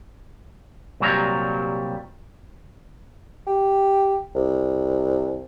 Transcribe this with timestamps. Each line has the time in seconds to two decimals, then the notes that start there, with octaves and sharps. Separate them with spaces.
1.00 C2 A#2 F#3 G3 G#4 A#5
3.47 G4
4.35 C2